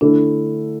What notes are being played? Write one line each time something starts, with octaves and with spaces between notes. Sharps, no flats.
D3 A3 D4 E4 A4